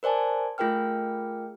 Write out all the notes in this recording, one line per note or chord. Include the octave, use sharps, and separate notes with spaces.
A#4 C5 D5 G#5 A5
A3 F4 G#4 A#4 G5 F6